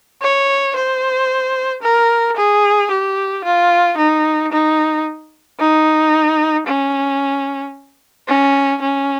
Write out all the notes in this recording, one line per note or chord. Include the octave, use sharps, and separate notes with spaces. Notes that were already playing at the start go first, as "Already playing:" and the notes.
C#5
C5
A#4
G#4
G4
F4
D#4
D#4
D#4
C#4
C#4
C#4